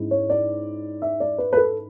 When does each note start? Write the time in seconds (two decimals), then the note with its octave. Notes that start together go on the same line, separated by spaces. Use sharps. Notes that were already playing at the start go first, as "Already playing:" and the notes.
Already playing: G#2 G#3 C#4 E4
0.11 C#5
0.30 D5
1.02 E5
1.20 D5
1.38 B4
1.53 B4
1.57 A4